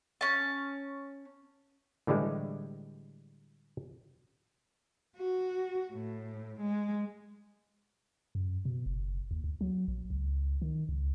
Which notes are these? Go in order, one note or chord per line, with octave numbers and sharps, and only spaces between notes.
C#4 A5
A2 D3 E3 G3 G#3
F#4
A2
G#3
F#2
B2
F#1
D#2
D2
F#3
A#1
C#2
D#3
C#2